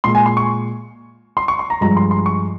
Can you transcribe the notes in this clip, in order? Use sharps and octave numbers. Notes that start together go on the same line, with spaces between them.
A#2 G#3 C6
G#5
C6
C#6
C6
C#6
C6
A#5
G2 F3 G#3 A#5
C6
C6
C#6